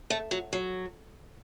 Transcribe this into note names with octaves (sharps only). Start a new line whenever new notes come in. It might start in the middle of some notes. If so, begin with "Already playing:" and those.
A3
F#3
F#3